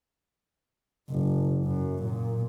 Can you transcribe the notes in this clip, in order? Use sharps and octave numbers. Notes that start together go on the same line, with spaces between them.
F#1
F#2
A#2